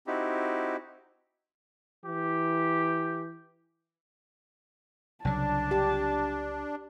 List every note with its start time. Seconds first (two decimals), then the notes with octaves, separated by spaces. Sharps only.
0.07 C4 D#4 E4 F#4 G4
2.05 E3 G4
5.25 C2 C#3 F#3 D4 A5
5.71 G4